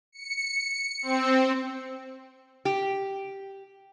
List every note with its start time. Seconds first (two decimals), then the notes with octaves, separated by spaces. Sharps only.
0.12 C#7
1.02 C4
2.65 G4